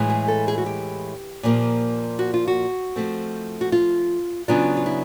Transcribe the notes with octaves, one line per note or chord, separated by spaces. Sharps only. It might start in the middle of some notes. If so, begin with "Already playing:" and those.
Already playing: A2 E3 G#3
G#4
A4
G#4
F#4
G4
A#2 F3 A#3
F#4
F4
F#4
F3 A3 C4
F#4
F4
C#3 F#3 B3 D4 F4
F4
E4